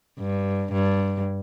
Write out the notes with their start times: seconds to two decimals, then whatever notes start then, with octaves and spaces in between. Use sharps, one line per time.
0.19 G2
0.72 G2